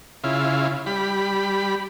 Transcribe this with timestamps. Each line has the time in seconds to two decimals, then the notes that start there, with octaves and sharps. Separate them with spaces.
0.24 C#3 E4 F4
0.86 G3 B5